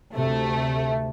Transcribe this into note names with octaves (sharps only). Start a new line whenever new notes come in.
D2 C3 A3